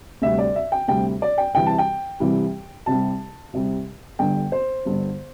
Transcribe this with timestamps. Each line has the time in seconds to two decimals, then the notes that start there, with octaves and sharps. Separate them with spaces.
0.22 D2 C3 G3 E5
0.39 D5
0.56 E5
0.72 G5
0.88 D2 C3 G3 G5
1.22 D5
1.38 G5
1.54 C2 C3 E3 G3 G5
1.66 A5
1.78 G5
2.20 C2 C3 E3 G3
2.86 C2 C3 G3 A5
3.53 C2 C3 G3
4.19 G1 G2 D3 G5
4.52 C5
4.85 G1 G2 D3